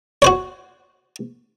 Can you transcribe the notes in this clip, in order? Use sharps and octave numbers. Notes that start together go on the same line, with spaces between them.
F#4 C5 C#5